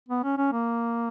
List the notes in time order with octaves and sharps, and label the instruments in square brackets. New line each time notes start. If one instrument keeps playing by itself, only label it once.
[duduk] B3
C#4
C#4
A#3